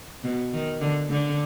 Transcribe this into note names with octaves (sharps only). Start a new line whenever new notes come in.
B2
D#3
D3
D3